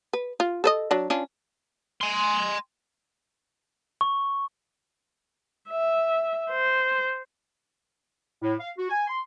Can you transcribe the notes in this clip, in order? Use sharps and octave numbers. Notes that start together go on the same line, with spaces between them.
B4
F4
A4 B4 D#5
F#3 D4
C#4 D4 F4
G#5 C6
C#6
E5
C5
A2
F5
F#4
G#5
C6